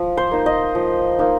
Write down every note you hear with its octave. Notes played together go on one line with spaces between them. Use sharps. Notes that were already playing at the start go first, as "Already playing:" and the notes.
Already playing: F3
C5
A#3 D#4
D#5
F3
A#3 D#4